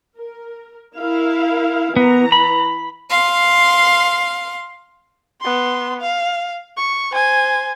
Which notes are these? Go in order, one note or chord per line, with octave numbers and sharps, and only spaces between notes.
A#4
E4 A#4 F5
E3 B3 A#5
B5
F5 C6
B3 C6
F5
C#6
C5 G#5